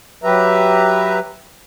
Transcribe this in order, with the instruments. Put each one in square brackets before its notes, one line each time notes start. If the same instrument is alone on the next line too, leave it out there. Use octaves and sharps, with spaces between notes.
[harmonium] F#3 G4 B4 E5 A#5